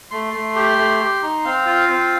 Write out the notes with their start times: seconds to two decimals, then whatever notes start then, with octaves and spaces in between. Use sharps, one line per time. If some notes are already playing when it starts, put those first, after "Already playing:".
0.11 A3 C6
0.34 A3
0.56 G4
0.78 A3
1.00 G4
1.22 D#4
1.45 C4 F5
1.66 F4
1.89 C4